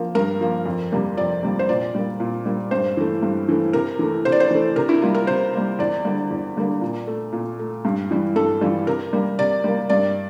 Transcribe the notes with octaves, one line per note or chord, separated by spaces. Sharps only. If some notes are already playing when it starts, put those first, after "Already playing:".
Already playing: F3 A#3
G2 A#4
F3 A#3
F2
C3 G3 A#3
F2 D5
C3 G3 A#3
C5
A#2 D5
G3 A#3
A#2
G3 A#3
G2 C5
E3 A3
G2
E3 A3
C3 A#4
E3 A3
C3 C5
D5
C5
E3 A3
C3 A#4
E4
G3 A#3 F4
A#4
C3 C5
G3 A#3
E2 D5
D3 G3 A#3
E2
D3 G3 A#3
A#2
A3
A#2
A3
G2
E3 G3
G2 A4
E3 G3 F4
C3 A#4
G3 A#3
C3 D5
G3 A#3
G2 D5